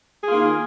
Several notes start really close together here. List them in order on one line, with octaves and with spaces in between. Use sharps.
G#4 F4 A#3 D#3